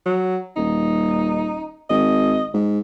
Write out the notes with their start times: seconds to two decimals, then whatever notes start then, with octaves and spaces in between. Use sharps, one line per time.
0.06 F#3
0.56 D#1 D#4
1.90 G#1 D#5
2.54 G#2